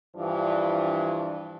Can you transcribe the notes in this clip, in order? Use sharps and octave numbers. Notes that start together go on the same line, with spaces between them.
G2 E3 F3 D4